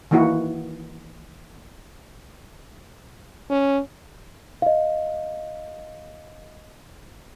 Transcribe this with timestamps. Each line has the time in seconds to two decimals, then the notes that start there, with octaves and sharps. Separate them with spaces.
0.11 D#3 E3 A#3 E4 F#4
3.50 C#4
4.62 D#5 F5